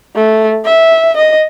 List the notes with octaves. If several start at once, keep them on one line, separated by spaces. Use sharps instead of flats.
A3
E5
D#5